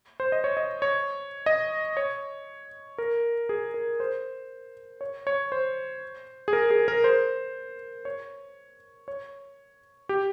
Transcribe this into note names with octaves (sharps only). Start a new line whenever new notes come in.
C5
D#5
C#5
D#5
C#5
D#5
C#5
A#4
G#4
A#4
C5
C#5
C#5
C5
G#4
A#4
G#4
A#4
C5
C#5
C#5
G4